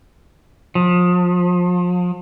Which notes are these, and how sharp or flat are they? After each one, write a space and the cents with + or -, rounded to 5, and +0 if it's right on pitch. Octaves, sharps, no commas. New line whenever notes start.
F3 +35